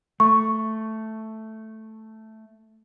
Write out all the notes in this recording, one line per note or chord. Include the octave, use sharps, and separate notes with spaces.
A3 C#6